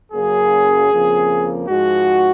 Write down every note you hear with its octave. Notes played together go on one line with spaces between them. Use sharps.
F#2 C#3 F#3 A#3 G#4
F2 C#3 F3 A#3
G#2 F3 G#3 F#4